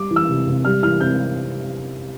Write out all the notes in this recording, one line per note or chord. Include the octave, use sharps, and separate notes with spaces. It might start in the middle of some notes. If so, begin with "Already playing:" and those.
Already playing: G3 D6
E3
E6
C3
C3
G3 F6
E3 F6
C3 G6